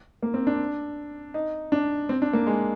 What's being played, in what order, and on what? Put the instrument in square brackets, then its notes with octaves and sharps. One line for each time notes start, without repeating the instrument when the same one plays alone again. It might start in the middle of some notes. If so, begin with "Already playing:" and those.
[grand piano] A#3
C4
D4
D#4
D4
C4
D4
A#3
G#3